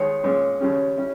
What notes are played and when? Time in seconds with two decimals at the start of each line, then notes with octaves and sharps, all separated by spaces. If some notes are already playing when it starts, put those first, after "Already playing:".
Already playing: D#2 D#3 G#3 C#5
0.24 A#2 G#3 C#4
0.60 D#2 C#3 G3 C#4
0.97 G3 C#4 E4